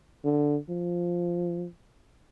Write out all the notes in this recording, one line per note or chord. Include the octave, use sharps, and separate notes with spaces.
D3
F3